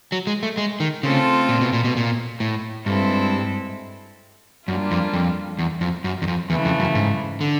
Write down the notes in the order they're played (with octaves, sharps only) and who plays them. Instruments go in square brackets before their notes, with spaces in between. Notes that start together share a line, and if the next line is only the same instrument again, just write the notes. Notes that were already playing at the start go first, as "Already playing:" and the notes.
[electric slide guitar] F#3
G#3
A3
G#3
D#3
[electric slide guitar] C#3 [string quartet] A3 C4 F4 A4
[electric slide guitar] A#2
B2
A#2
B2
A#2
A2
[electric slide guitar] G2 [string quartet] G#3 C4 E4 A4
[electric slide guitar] F#2 [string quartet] G3 A#3 D4 F4
[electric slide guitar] F2
F2
E2
F2
F#2
E2
F2
[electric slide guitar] E2 [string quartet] C#3 E3 A3
[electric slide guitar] F2
F#2
G#2
D3